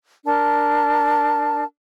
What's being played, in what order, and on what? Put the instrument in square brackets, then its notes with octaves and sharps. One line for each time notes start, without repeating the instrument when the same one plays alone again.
[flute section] D4 A#4 A5